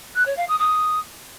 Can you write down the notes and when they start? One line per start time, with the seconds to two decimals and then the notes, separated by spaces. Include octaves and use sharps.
0.14 F#6
0.25 C#5
0.36 F5
0.47 D#6
0.58 D#6